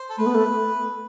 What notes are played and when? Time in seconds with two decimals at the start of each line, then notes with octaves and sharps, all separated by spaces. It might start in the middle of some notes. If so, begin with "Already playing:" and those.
Already playing: C5
0.10 A4
0.18 A3 B4
0.26 B3
0.35 A3